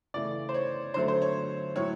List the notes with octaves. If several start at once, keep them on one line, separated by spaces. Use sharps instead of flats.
C#3 E3 A3 D5
C5
C#5
D3 F#3 A3 C5
C5
C#5
A2 F#3 A3 C#5